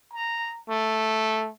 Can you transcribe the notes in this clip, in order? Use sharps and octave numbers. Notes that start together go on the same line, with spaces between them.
A#5
A3